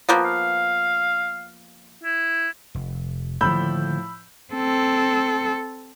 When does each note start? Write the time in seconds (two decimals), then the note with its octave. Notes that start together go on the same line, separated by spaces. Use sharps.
0.09 F3 A#3 B3
0.25 F5
2.04 E4
2.75 F1
3.41 A2 D3 D#3 F3 A#3 B5 E6 G6
4.54 C4 A4